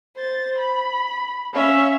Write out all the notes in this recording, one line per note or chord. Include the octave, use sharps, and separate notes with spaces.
C5 A6
B5
C#4 E5 F5